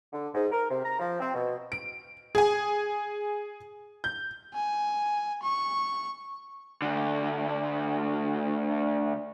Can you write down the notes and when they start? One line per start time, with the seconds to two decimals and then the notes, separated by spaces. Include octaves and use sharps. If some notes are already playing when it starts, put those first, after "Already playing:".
0.13 D3
0.34 G#2
0.52 A#4
0.70 C3
0.84 A#5
0.99 F3
1.20 C4
1.34 B2
1.72 D7
2.35 G#4 G#5
4.04 G6
4.54 G#5
5.43 C#6
6.82 D2 D3